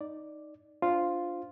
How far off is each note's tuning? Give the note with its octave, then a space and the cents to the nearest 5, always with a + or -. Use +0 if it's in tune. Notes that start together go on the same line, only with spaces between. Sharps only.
D#4 +0 D5 +0
D4 -5 F4 +0 C5 +0